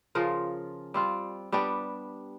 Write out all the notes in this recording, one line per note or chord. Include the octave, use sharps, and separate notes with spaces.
C#3 F3 F4 A#4
G3 C4 F4
G3 B3 D4 G4